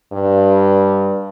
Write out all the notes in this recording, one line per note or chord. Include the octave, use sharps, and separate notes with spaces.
G2